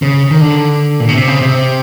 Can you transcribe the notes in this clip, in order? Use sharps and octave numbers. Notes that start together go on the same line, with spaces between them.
C#3
D#3
D3
A#2
B2
C3
C#3
C3